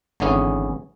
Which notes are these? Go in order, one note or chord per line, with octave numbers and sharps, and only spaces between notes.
G#1 D3 E3 B3 C#4 G#4